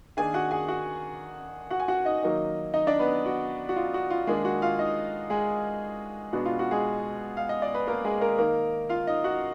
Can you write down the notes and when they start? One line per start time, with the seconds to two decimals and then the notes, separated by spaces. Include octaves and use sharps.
0.17 D#3 A#3 D4 G#4 G#5
0.34 F#4 F#5
0.51 G#4 G#5
0.68 F#4 F#5
1.71 F#4 F#5
1.80 G#5
1.88 F#4 F#5
2.05 D#4 D#5
2.23 D#3 F#3 A#3 D#4
2.74 D#4 D#5
2.87 D4 D5
2.99 B3 B4
3.26 F#4
3.69 F#4
3.76 F4
3.94 F#4
4.10 F4
4.27 D#3 G#3 A#3 D4 G#4
4.45 F#4
4.62 F4 F5
4.79 D#4 D#5
5.30 G#3 G#4
6.33 B2 G#3 B3 D4 F#4
6.45 F4
6.59 F#4
6.71 G#3 G#4
7.37 F5
7.49 D#5
7.62 D5
7.75 B4
7.87 A#3 A#4
8.05 G#3 G#4
8.21 A#3 A#4
8.38 D#3 A#3 D#4 A#4
8.89 F4 F5
9.07 D#4 D#5
9.24 F#4 F#5